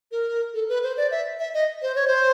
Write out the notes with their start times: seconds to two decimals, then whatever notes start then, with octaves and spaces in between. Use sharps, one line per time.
0.12 A#4
0.54 A4
0.69 B4
0.83 C5
0.97 D5
1.11 E5
1.39 E5
1.54 D#5
1.82 C5
1.95 C#5
2.08 C5